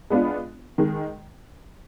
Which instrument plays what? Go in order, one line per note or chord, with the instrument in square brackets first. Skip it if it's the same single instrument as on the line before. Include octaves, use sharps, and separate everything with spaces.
[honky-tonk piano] G#3 B3 D4 F4
D#3 G#3